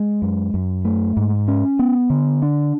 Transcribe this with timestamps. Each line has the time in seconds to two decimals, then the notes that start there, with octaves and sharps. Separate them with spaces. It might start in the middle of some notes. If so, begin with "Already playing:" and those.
Already playing: G#3
0.22 F#2
0.54 F#2
0.85 A3
1.17 G#2
1.48 C#4
1.79 B3
2.10 D3
2.42 D4